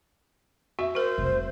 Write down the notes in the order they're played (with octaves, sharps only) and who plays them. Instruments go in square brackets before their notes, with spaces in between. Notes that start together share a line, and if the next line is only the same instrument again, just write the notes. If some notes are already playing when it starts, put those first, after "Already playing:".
[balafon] F#4 [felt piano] E5
[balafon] F#4 A#4 [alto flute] C5
[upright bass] F1 C2